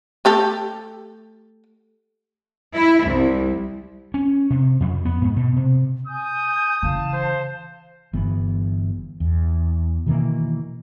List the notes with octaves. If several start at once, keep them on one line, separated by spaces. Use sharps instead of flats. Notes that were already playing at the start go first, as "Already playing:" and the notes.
A3 G4 A4
E4
C2
C#4
C3
F2
B3
G#2
B2
C3
G#5 D#6 G6
C#3 E3 F5 A5
C5
G1 E3 B3
E2
B2 D#3 E3 A#3